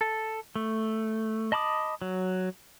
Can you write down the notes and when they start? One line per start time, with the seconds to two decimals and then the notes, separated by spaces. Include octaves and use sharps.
0.01 A4
0.56 A3
1.52 D#5 A5 B5 D6 D#6
2.02 F#3